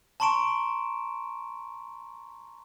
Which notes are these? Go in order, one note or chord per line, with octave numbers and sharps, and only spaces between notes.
A5 A#5 C6 C#6 D7 E7